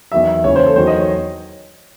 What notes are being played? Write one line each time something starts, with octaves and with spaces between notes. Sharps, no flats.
E2 D#3 F#3 E5
D#2 C#3 E3 C#5
C5
A4
E2 D#3 F#3 C5
D#5
C#5